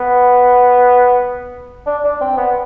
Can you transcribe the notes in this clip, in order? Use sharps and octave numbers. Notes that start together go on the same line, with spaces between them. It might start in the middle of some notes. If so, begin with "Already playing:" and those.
Already playing: B3
D4
D4
C4
B3